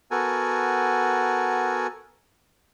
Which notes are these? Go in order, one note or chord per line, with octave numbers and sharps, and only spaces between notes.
B3 F#4 A4 A#4 G#5